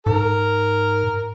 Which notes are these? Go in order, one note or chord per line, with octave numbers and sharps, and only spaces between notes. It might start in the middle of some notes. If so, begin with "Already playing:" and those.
G#2 A#4